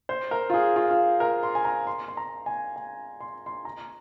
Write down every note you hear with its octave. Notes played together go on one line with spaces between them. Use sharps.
C5
A#4
F4
G#4
F4
F4
A#4
C6
G#5
A#5
C6
C6
A#5
G#5
G#5
C6
C6
A#5